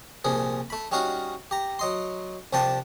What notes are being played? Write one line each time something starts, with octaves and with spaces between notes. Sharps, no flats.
C2 A#2 F3 G#4
A3 B5
G3 C#4 D#4 F#4 F5
G4 A#5
F#3 D#5 C6
C2 F3 D4 G4 G5 A5